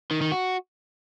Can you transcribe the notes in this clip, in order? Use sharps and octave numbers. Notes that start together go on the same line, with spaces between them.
D#3
D#3
F#4